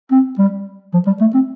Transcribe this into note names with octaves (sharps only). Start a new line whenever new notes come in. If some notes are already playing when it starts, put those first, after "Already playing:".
C4
G3
F3
G3
A3
C4